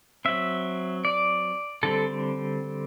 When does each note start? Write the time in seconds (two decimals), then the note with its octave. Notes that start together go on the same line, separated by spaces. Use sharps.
0.25 F#3 C4 E5
1.05 D5
1.83 D3 G3 C4 A4